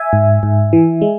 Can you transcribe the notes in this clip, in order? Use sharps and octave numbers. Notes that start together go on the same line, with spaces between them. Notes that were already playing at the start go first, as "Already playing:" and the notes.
Already playing: E5 G#5
G#2
G#2
E3
G#3